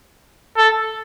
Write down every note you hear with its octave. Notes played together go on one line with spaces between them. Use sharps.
A4